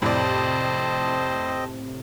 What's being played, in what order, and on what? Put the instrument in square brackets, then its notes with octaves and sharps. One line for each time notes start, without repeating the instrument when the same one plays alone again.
[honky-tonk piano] F2 D5 [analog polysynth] A2 C3 [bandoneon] C4 D#5 [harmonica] C5 A5